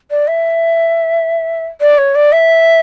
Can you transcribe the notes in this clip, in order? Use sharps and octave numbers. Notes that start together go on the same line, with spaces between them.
D5
E5
D5
C#5
D5
E5